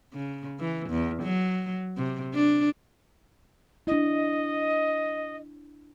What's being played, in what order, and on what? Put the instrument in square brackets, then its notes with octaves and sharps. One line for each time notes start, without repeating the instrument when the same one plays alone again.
[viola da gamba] C#3
E3
E2
F#3
C3
D4
[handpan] D4 E4 [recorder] D#5